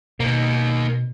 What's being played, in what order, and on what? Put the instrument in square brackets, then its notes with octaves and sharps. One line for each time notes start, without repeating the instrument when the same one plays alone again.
[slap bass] B2 [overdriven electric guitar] A#3 D#4